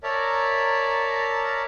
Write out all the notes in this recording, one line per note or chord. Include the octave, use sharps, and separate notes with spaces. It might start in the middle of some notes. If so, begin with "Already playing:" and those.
A#4 C#5 D5 E5 A5 A#5